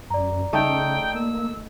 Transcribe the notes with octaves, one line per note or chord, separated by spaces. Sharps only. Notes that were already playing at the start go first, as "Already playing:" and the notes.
F#2 D5 A#5
C#3 A3 D#4 A4 G5
A#3 E6